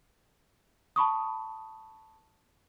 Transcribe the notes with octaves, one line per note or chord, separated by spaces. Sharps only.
A5 B5 C#6 D#6